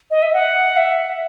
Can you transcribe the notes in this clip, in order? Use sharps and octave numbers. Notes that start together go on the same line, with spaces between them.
D#5
E5
F#5
E5